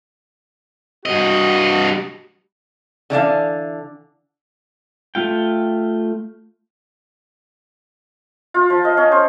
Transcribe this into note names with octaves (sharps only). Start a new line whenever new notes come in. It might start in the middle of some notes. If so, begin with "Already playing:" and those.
G2 F#4 D#5
D3 E3 D4 F5
A3 F4 G5
F4
F3
D#5
C#4
C5